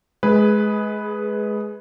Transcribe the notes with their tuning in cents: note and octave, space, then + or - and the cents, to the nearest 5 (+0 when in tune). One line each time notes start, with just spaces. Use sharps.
G#3 +30 G#4 +0 B4 +0